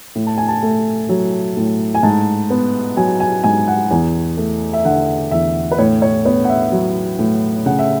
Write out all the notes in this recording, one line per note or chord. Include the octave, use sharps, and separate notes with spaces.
A2
A5
G#5
A5
A3
F#3
A2
G#5
G#2 A5
B3
F#3 G#5
G#5
G#2 G#5
F#5
E2 G#5
A3
E5
D3 F#5
E2 E5
B4
A2 C#5
C#5
B3 C#5
F#5
E5
F#3
A2
C#3 F#5
E5